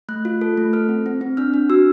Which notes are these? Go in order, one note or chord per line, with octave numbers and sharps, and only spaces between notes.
A3 F#6
F4
A4
A3
A4 F6
C4
C4
C4
D4 F6
D4
F#4 E6